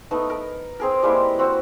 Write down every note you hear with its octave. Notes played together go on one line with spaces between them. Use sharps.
A3 B3 D#4
A#4
C4 G#4 A#4
G3 G#3 A#3 E4
C4 F#4